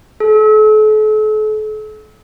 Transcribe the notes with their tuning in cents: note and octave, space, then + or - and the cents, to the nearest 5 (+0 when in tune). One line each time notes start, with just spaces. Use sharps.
A4 -40